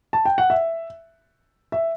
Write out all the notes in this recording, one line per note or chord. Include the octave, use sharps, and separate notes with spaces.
A5
G5
F#5
E5
E5